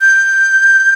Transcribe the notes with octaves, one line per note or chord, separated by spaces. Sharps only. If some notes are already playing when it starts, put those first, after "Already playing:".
G6